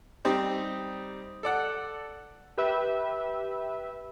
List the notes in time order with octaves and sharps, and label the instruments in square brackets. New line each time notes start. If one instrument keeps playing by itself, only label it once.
[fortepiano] G3 C4 D#4 G4
A4 D5 F#5
[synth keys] G4 B4 E5